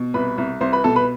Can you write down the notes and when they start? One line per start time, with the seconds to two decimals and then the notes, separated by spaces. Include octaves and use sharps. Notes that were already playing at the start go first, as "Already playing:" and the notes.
Already playing: B2
0.14 C2 B4 B5
0.38 C2
0.61 C2 C5 C6
0.72 B4 B5
0.84 B2 A4 A5
0.96 B4 B5